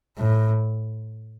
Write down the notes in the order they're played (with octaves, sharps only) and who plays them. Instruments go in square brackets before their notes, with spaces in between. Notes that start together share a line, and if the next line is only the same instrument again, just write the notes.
[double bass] A2